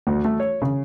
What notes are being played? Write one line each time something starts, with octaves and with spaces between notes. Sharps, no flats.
D2
A3
C#5
C#3